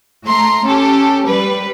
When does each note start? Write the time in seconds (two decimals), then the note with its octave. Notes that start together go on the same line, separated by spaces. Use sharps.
0.24 A3 A#5 C6
0.65 C#4 G4 A4
1.26 G3 B4